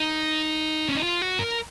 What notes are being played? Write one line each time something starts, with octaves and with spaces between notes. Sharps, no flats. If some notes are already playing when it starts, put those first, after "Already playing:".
Already playing: D#4
C#4
D#4
F4
F#4
A#4